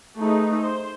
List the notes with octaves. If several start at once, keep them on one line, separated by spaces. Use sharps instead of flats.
A3 D#4 G#4 B4
C5